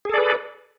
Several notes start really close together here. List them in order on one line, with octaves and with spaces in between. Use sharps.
G#4 A4 D5 B4